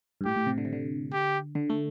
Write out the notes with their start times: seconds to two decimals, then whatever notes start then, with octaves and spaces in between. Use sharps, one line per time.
0.21 G2
0.25 A2 G4
0.36 A2
0.47 C3
0.58 D3
0.65 C3
0.73 D3
1.13 G4
1.55 D3
1.70 A3